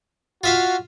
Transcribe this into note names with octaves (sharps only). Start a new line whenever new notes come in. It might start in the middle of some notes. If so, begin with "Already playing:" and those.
F4 F#4 E5 F5